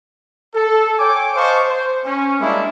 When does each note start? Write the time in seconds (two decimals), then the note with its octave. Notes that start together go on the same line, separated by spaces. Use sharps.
0.55 A4
0.98 C#5 G5 G#5 D6
1.36 C5 D#5 F5 A5 C#6 D6
1.67 C5
2.05 C#4
2.40 G3 G#3 A#3 D4 E4